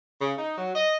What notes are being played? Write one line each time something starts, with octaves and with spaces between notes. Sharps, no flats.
C#3
D#4
F#3
D#5